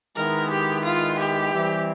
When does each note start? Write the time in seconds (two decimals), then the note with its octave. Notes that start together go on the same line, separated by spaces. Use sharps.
0.16 D#3 G#3 B3 E4 A#4
0.50 G4
0.85 F4
1.19 G4
1.53 E3 G3 C4 E4